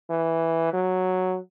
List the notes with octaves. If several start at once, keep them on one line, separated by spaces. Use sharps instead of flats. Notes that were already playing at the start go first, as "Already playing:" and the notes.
E3
F#3